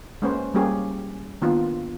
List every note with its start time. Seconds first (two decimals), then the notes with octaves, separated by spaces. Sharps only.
0.22 G#3 A#3 C#4 B4 C5
0.54 G3 A#3 C#4 G4 G#4
1.42 D#3 A#3 B3 D4 F4